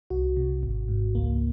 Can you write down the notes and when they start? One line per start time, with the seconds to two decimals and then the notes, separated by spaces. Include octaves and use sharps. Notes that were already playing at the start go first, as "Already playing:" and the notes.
0.10 C2 F#4
0.37 C3
0.63 G#1
0.88 G#2
1.15 C#2 A#3